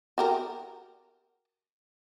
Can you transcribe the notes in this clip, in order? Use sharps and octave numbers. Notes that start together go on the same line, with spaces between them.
F#4 G4 A#4